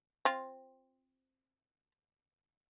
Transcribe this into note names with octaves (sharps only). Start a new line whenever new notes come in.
C4 F4